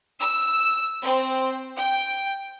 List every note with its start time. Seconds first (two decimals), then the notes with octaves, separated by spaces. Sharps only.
0.19 E6
1.03 C4
1.76 G5